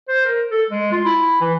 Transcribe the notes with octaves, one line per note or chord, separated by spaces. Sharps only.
C5
A#4
A4
G#3
F4
E4
E3